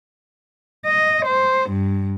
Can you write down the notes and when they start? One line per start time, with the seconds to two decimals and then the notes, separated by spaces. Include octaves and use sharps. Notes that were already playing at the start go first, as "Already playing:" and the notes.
0.85 D#5
1.26 C5
1.70 G2